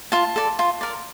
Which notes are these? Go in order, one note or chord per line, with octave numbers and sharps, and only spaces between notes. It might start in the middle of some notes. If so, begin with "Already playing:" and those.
F4 A5
A4 D5
F4
A#4 D5